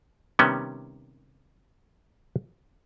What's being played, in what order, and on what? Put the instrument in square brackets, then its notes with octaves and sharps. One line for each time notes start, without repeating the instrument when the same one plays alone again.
[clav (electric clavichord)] C3 D#3 G3 B3 C#4